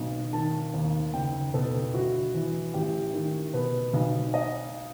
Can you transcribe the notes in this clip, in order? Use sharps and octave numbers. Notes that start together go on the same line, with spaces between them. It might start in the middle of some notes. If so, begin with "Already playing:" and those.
Already playing: B1 B2
D#3 A5
D#2
F#1 G5
B2 A4
G1 F#4
E3
A1 G4
D#3
B2 B4
B1
D#5